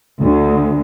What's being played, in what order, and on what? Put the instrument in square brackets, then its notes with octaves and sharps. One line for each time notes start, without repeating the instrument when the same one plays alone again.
[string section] D2